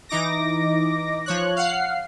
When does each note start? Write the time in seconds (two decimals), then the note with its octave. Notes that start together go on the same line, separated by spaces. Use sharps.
0.09 E3 D#4 D6 A#6
1.26 F3 C#5 F#6
1.56 F5 F#5 C7